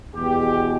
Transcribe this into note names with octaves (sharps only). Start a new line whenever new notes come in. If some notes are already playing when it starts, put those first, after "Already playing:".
E2 B2 G#3 G4